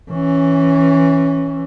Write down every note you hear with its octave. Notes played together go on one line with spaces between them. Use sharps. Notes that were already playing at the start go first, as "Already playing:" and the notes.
E3 C#4